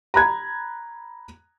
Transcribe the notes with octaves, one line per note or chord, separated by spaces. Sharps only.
A#5 B5 F#6 G#6